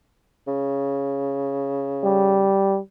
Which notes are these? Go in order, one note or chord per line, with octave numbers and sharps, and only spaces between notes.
C#3
G3